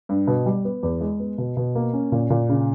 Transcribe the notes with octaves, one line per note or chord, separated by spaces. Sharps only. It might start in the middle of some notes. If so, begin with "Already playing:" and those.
G2
B2
G3
B3
E2
G#3
B3
B2
B2
A#3
C#4
A#2
A#2
C#3